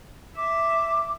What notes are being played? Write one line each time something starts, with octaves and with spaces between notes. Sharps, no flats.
E5 D6